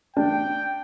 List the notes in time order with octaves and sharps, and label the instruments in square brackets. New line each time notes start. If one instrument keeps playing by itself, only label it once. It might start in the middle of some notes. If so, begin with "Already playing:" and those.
[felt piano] D4 [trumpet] G5